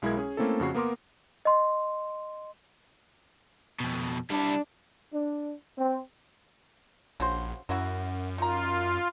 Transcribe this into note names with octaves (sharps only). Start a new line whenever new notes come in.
B1 G#3 E4 G#4 A#4 G#6
C#4 G#4
A3 A#3 C4 C#4 E4 A4
F2 C#3 F#4 C7
A#3 B3 A#4 C6 D6
D#5 C6
F2 B2
G3 D4 E4
D4
C4
A#1 C#3 F#4 C5
F#2 F#3 E4 F#4
D#3 F4 A#5